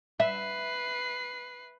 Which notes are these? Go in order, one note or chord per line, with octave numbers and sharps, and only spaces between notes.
B4 E5 C7